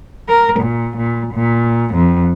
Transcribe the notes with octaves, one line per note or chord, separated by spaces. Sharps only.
A#4
A#2
A#2
A#2
F2